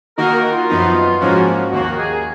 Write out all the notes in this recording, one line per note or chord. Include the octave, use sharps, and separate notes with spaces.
D#3 A#3 D#4 F#4 A#4
A#4
F4
F#2 F3 B3 D#4
G#2 F3 A#3 C#4 F#4
D#2 D#3 A#3 F#4
G#4